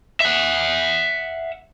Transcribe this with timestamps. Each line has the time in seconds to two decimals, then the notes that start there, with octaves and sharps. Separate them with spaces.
0.20 E5 F#5